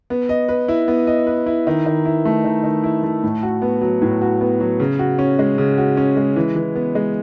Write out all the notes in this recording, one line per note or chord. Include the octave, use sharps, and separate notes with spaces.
B3
D#5
B4
E4
B3
D#5
B4
E4
D#3
D#3
E4
A3
D#3
D#3
E4
A3
A2
F#4
B3
F#3
A2
F#4
B3
F#3
C#3
F#4
C#4
G#3
C#3
F#4
C#4
G#3
E3
E3
B3
G#3